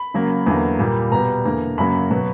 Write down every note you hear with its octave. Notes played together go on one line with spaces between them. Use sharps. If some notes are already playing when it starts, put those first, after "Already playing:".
Already playing: B5
C#3 F#3 A#3
E2 D3 F#3 A#3
A#2 G3 A#3
B2 G3 B3 A#5
E2 D3 A#3
F#2 C#3 F#3 A#3 B5
B2 F#3 B3